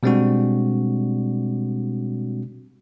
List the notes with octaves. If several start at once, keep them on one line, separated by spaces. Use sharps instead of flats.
B2 G3 G#3 C4 D4 F#4